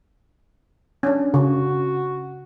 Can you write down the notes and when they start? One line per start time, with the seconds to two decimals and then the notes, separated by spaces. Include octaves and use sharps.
1.03 C#4 D4
1.34 C#3 F#4